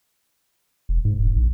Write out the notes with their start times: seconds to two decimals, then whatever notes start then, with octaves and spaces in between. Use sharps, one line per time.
0.89 E1
1.05 G#2
1.18 E1
1.36 A#1